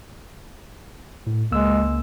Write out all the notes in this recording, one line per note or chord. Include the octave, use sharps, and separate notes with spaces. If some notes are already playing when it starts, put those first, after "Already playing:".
A2
C#2 G#3 A#3 E6